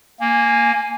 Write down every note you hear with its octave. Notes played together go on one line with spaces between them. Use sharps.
A#3 G#5